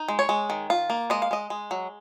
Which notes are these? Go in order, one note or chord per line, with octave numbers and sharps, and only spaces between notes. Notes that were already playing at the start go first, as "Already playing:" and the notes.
Already playing: D#4
G#3
C#5
G#3
D#3
F4
A#3
G#3 D#5
F5
G#3 D#5
G#3
F#3